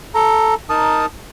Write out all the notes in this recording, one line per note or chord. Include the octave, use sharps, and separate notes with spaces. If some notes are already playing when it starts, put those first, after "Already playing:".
A4 A#5
D#4 A#4 A5 D#6